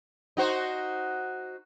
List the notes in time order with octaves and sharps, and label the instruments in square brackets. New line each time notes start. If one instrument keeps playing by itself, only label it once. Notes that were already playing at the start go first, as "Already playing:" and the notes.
[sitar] D#4 F#4 C5